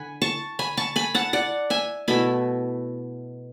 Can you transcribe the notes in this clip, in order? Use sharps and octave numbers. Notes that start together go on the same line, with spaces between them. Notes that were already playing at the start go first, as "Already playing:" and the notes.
Already playing: D3 F#5 G#5 B5
A5 C#6
G#5 B5
A5 C#6
G#5 B5
F#5 A5
D5 F#5
E5 G#5
B2 A3 E4 G#5 B5